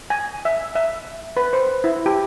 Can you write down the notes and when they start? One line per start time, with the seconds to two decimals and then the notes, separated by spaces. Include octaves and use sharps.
0.10 G#5
0.45 E5
0.75 E5
1.37 B4
1.53 C5
1.84 E4
2.06 G4